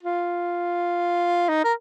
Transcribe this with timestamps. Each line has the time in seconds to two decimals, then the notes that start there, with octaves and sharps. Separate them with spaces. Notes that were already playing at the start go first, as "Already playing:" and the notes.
0.03 F4
1.49 D#4
1.65 A#4